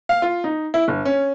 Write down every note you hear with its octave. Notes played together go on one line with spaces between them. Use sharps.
F5
F4
D#4
E4
G1
C#4